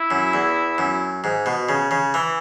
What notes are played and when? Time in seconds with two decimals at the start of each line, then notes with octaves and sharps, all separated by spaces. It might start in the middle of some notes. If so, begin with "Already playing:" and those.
Already playing: E4
0.11 F#2
0.34 E2
0.78 F#2
1.24 G#2
1.46 B2
1.69 C#3
1.91 C#3
2.14 E3